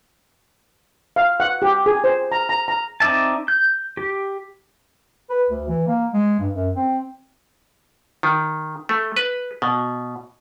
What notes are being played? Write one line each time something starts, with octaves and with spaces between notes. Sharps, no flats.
F5
F#5
G4
G#4
C5
A#5
A#5
A#5
C4 D#4 D5 E5 A5
G6
G4
B4
D2
E3
A#3
G#3
G2
F#2
C4
D#3
A3
B4
B2